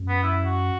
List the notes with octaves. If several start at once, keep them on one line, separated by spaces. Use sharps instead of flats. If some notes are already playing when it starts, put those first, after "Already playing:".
Already playing: F#2
B3
E4
F#4